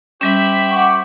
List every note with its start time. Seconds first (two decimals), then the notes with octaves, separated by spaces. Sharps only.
0.21 G3 C#4 G4 C5 E5 G5 B5
0.70 F#5 C#6 D6